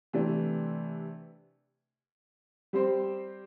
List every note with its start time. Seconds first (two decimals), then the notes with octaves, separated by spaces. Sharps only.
0.13 C3 E3 A3 D4
2.73 G3 C4 G4 C5